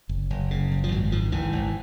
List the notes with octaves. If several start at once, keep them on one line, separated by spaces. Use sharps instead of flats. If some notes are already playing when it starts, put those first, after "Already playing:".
F#1
F#1
C#3
F#1
F3
G#1 F#3
G#2 F3
G#1 E3
G#1